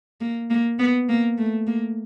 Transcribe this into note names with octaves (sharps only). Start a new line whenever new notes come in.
A#3
A#3
B3
A#3
A3
A#3